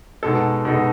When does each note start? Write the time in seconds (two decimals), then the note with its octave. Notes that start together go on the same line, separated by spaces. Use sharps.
0.23 B2 G#3 D#4 A4
0.65 B2 G#3 D#4 A4